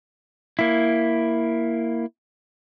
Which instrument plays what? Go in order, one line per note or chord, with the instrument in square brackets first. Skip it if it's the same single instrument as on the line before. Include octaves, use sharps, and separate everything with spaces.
[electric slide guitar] A#3 E4